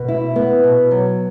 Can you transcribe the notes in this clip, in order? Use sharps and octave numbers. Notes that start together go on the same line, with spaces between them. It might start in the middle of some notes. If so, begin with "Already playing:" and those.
Already playing: B2
E4
B3
B2
F#3